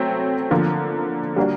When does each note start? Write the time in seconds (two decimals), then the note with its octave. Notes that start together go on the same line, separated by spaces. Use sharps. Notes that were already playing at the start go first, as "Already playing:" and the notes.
Already playing: F#3 A3 C4
0.51 D3 F3 A#3
1.36 G3 A#3 D4 F#4